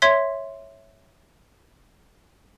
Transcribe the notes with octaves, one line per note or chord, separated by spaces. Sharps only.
C#5 E5 C6 G#6 B6